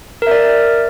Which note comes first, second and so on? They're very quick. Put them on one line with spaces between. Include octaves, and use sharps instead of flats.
A#4 E5 D5